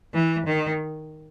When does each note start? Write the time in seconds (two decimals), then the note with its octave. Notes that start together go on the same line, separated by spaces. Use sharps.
0.14 E3
0.46 D#3